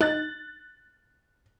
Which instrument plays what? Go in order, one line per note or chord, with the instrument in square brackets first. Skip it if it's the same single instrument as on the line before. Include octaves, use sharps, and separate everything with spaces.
[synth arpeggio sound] D#4 [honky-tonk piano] F#6 A6